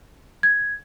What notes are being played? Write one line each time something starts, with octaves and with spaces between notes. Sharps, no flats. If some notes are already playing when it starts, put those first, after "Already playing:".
G#6